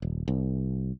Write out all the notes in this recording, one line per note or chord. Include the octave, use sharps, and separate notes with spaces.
D#1
C2